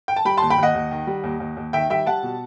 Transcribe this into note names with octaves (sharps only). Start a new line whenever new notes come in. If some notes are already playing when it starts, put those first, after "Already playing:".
G5
A5
G3 G5 B5
D#2 A5 C6
G5 B5
D#2 D#5 F#5
D#2
D#3
G3
D#2
D#2
D#2
D#3 E5 G5
G3 E5 G5
G3 F#5 A5
B2